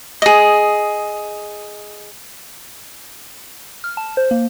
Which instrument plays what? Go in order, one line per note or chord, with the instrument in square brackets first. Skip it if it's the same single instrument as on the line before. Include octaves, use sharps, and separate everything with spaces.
[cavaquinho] G#4 D#5
[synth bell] F6
A5
C5
A#3